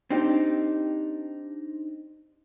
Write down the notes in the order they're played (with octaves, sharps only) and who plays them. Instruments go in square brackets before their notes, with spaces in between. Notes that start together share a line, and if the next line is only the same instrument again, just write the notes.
[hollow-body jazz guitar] C4 D4 D#4 G4